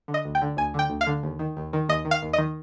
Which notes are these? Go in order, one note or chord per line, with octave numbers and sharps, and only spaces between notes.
D3
D#5
D2
G5
D3
D2 G#5
D3 G5
D2
F5
D3
D#2
D#3
D#2
D#3
D#2 D#5
D#3
F5
D#2
D#5
D#3